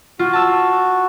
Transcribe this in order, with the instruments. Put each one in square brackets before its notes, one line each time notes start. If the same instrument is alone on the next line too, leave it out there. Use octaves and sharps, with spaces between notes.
[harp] F4 [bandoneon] F#4
[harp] A5 E6